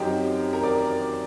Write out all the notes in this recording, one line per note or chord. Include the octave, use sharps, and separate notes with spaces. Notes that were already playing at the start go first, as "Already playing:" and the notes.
Already playing: F#2 F#3 C4 D#4 G4 G5
A#4 A#5
D5 D6